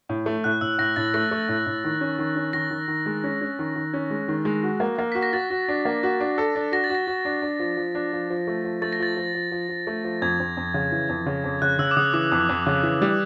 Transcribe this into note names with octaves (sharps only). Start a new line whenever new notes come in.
A2
A3
A2 F#6
A2 E6
A2 A#6
A2 A6
A3 A#6
A3
A2
A2
D#3
C#4
D#3
C#4
D#3 A#6
D#3
D#3
G#3
C#4
C#4
D#3
D#3
C#4
G#3
D#3
G#3
F#4
A#3
A#3
F#4 B6
A#6
F#4 A6
F#4
D4
A#3
F#4
D4
A4
D4
F#4 A#6
A6
F#4 A#6
F#4
D4
D4
F3
F3
D4
F3
F3
A3
F3
A3 A6
A#6
F3 A6
F3
F3
F3
F3
A3
F3
F2 G#6
F2
F2
C#3
E3
F2
C#3
F2
C#3 F#6
C#3 E6
D6
C#3 D#6
E3 D6
F2 D#6
F2
C#3
E3
G3